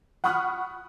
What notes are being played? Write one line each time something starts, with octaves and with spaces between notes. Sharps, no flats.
F#5 B5 C#6 D#6 F6 F#6